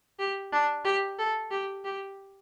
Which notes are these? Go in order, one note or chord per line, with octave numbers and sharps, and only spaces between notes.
G4
D4
G4
A4
G4
G4